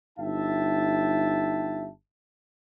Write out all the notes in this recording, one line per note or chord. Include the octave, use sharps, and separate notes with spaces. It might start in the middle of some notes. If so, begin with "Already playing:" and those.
G1 D#4 E5 G5 A5